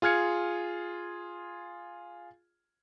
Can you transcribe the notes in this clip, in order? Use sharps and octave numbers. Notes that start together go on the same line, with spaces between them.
F4 G#4 F6 G#6 C#7